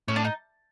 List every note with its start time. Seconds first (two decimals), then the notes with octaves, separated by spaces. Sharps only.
0.08 A2 C#4
0.16 D4
0.25 D#4